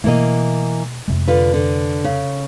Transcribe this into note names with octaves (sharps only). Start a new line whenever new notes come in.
B2 E3 A3 A#3 D#5
F2 C3 G#3
D3 F4 B4
D3
C#3